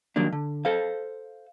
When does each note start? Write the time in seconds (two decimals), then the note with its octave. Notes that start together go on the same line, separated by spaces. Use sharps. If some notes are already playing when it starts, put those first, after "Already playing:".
0.16 D#3 F#3 G3 A#3 D4
0.33 D3
0.65 A4 C5 F5